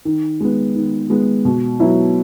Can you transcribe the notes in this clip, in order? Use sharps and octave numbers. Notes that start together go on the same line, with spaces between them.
D#3
G#3 B3
D#3
G#3 B3
B2
F#3 B3 E4